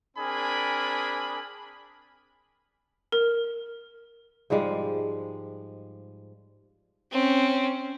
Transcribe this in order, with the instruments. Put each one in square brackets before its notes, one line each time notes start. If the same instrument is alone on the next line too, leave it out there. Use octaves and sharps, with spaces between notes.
[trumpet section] C4 D4 G#4 A#4 G#5 B5
[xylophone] A#4
[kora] G#2 F3 G3 G#3
[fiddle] C4 C#4